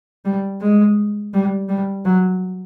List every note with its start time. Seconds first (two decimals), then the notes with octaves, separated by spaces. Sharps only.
0.25 G3
0.61 G#3
1.34 G3
1.69 G3
2.05 F#3